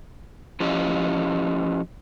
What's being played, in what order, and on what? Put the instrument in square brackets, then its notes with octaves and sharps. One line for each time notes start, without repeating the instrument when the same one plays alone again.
[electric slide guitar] F3 C#4 E4 F4 G4 D#5